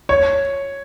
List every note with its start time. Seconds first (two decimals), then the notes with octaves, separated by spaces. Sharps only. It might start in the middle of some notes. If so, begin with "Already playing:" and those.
0.09 C#5